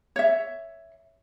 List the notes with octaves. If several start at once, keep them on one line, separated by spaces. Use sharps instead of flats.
C#5 E5